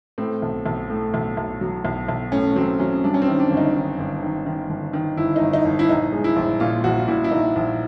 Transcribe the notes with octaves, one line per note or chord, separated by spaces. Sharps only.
A2 C4
B1
B1
A2
B1
B1
F#3
B1
B1
A2 C#4
F#3 C4
F#3 C#4
G2 D4
C#4
C4
D#3
D4
G1
D#4
D#3
G1
D#3
D#3
G1
D#3
G1 E4
D#4
G1
D#4
G1
E4
A#1 D#4
G#3
E4
A#1
A#2 F4
A#1 F#4
F4
A#2 E4
E4
A#2 D#4
A#1